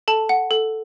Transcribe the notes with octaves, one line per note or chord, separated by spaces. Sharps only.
A4 A5
F#5
A4